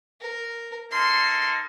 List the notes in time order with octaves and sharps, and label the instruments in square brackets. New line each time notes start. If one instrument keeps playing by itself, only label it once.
[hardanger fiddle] A#4
[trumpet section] A#3 D#4 A4 [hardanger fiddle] C6